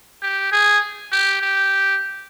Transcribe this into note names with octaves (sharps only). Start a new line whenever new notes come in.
G4
G#4
G4
G4